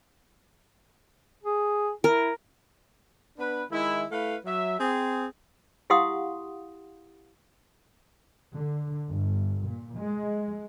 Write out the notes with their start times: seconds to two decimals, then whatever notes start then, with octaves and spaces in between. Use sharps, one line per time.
1.43 G#4
2.04 E4 A#4
3.38 B3 D4 B4
3.71 D#3 G#3 E4
4.11 A3 E4 B4 F5
4.46 F#3 E5
4.79 C4 G#4
5.90 E4 G4 F5 F#5 C6 D#6
8.53 D3
9.07 G1
9.65 A#2
9.98 G#3